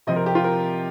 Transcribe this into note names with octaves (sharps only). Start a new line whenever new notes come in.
C3 F3 C4 D#5
A#4
G4
F4
A#4